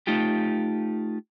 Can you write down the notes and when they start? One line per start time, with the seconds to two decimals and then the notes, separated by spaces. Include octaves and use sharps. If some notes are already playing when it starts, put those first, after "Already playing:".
0.07 A3 D#4 F4 G4